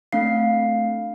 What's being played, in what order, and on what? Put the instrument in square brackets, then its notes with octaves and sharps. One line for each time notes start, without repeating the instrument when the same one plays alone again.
[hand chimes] A3 C4 D4 F5 C7